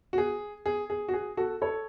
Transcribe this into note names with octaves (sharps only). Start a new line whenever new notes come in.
F#4
G#4
G#4
G#4
F#4
G#4
F#4 A4
A4 C#5